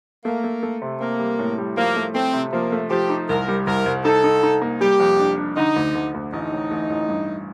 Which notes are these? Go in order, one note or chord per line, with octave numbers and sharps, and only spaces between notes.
A3 A#3
A3
A3
C3
A#3 C4
G3
A2
G3
F3 A#3
A3
A3 C4
C3
F3 A#3
A3
F3 G4
D#4
C2 A#4
G3
C2 A#4
C2
D#4 A4
D#4
D#4
A#3
G3 G4
F2
D4
D4
D3 D#4
D2
D2
D2
A1 D#4
A2
A1
A1
G2